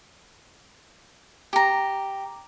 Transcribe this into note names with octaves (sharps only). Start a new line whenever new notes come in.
G4 A#5